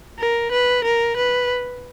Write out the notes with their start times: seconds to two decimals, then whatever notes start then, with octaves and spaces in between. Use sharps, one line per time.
0.19 A#4
0.52 B4
0.84 A#4
1.16 B4